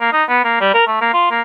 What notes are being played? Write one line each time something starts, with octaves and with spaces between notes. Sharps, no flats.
A#3
D#4
B3
A#3
G3
A#4
A3
A#3
F4
A#3